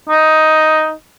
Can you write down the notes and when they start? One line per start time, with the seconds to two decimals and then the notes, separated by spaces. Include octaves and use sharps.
0.09 D#4